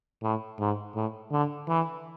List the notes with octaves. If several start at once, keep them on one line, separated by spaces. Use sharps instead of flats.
A2
G#2
A2
D3
E3